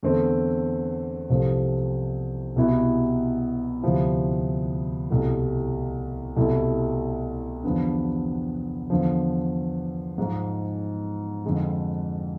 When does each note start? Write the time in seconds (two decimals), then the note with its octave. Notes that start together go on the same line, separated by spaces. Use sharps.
0.03 E2 D3 A3 C4
1.30 C2 C3 F3 A3 C4
2.56 C2 B2 B3 E4
3.83 D2 C3 F3 B3 E4
5.10 C2 B2 A3 E4
6.36 C2 B2 A3 E4
7.63 E2 D3 F3 B3 D4
8.90 E2 D3 F3
10.18 G#2 F3 G#3
11.45 F2 D3 G#3 D4